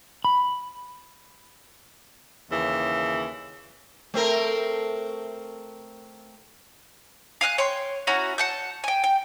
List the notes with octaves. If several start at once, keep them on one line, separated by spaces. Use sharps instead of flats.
B5
D#2 C#3 E3
A3 C4 A#4
F5 G#5 F6 F#6
C#5 G5 C6
C#4 E4 F#4 A#5
F#5 A5 G6
G5 G#5
G5